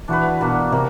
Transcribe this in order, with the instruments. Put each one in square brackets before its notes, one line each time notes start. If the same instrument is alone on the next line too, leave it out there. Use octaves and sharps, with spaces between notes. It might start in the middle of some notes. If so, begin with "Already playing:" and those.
[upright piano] E3 [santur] D4 F#4 B4
[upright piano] B2 [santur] A#3 D4 F#4
[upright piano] C3 [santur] A#3